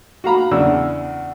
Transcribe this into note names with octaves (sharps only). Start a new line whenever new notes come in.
F#4 F5 A#5 B5
E2 C#3 D4 E6